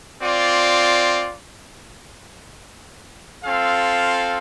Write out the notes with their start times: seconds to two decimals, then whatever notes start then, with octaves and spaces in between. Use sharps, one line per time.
0.21 C4 F4 D5
3.43 C4 F4 A4 F5